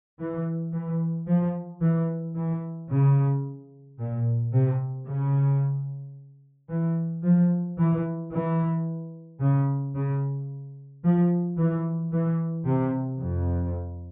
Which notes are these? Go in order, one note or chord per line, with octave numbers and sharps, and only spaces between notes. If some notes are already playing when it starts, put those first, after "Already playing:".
E3
E3
F3
E3
E3
C#3
A#2
C3
C#3
E3
F3
E3
E3
C#3
C#3
F3
E3
E3
C3
F2